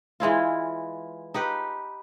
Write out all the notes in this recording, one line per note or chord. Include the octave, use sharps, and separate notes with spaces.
E3 G#3 E4 F4
D#4 G4 B4